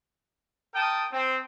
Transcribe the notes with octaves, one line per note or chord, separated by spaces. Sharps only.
A#4 G5 A5 D#6
C4